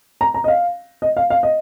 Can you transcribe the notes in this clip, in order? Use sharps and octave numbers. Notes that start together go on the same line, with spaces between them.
A#5
A#5
D#5
F5
D#5
F5
F5
D#5